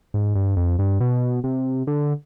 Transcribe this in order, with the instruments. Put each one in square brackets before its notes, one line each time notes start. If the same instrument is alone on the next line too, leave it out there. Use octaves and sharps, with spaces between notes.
[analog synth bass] G#2
G2
F2
G2
B2
C3
D3